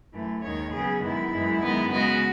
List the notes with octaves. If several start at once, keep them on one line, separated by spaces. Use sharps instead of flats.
F#2 E3 A3
D#2 D#3 G#3 C#5
C#3 F#3 B3 G#4
F#2 D#3 G#3 B3 E4
F#2 E3 G#3
F#2 D#3 G#3 B3
C#3 G#3 B3 F#4